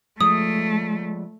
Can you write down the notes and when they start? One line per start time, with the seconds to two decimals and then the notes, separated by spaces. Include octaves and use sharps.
0.21 F3 G#3 A3 D#6